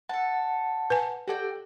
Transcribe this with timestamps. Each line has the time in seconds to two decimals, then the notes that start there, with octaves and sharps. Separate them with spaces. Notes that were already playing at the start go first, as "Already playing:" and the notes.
0.09 A4 F#5 A5
0.90 B4 G#5
1.28 F#4 G4 A4 D5 G5